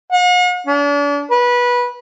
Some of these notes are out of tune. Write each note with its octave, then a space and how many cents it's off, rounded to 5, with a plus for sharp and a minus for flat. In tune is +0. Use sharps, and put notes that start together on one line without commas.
F#5 -45
D4 -40
B4 -20